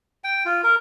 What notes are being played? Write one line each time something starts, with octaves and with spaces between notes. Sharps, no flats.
G5
F4
A#4